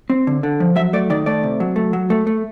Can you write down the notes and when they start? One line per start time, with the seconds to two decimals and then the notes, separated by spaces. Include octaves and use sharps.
0.10 C4
0.27 D3
0.43 D3
0.60 F3
0.76 F#3 E5
0.93 A3 D5
1.10 D#3 D5
1.26 A3 D5
1.43 C3
1.60 F#3
1.76 A3
1.93 F#3
2.10 A3
2.27 A3